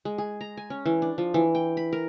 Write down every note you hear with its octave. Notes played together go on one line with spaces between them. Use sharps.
G#3
G#4
A#5
G#5
C#4
E3
D4
F3
E3
G5
B5
A#4